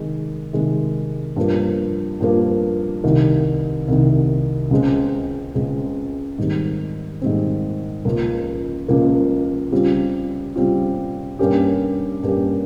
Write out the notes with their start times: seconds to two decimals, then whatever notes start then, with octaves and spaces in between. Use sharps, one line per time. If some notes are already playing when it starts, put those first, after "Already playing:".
Already playing: C3 D#3 G#3
0.53 C3 D#3 G#3
1.36 G2 F3 A#3
2.20 G2 F3 A#3
3.04 C2 C3 D#3
3.88 C2 C3 D#3
4.71 C#2 C#3 G#3 C4
5.55 C#2 C#3 G#3 C4
6.38 G#2 D#3 G3 C4
7.21 G#2 D#3 G3 C4
8.05 C#2 C#3 F3 A#3
8.88 C#2 C#3 F3 A#3
9.72 C#3 G3 C4 F4
10.56 C#3 G3 C4 F4
11.39 G2 G3 A#3 C#4 G4
12.23 G2 G3 A#3 C#4 G4